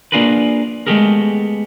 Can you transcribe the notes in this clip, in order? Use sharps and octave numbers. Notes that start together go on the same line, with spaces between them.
A#3 D4 F4 G#4 A#4 B4
G#3 A3 B3 G4 G#4 A#4